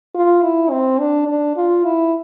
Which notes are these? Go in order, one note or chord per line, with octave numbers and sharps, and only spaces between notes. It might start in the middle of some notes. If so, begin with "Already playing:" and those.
F4
E4
C4
D4
D4
F4
E4